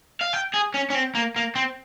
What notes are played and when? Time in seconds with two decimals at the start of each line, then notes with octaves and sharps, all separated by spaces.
0.21 F5
0.33 G5
0.54 G#4
0.74 C#4
0.90 C#4
0.94 C4
1.15 A#3
1.36 A#3
1.55 C4